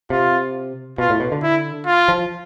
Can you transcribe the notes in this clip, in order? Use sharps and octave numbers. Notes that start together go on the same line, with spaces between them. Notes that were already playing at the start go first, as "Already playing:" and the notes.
C3 F4
B2 F4
A2
B2
D3
E4
F4
F3